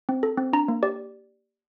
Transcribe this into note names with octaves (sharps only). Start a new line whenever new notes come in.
C4
A4
C4
D4 A#5
A#3
G4 D5